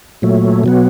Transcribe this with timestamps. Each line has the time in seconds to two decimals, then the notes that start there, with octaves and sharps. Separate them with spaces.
0.22 A#2 F#3 A3
0.64 B2 F#3 B3